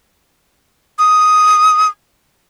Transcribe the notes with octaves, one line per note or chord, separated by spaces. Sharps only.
D#6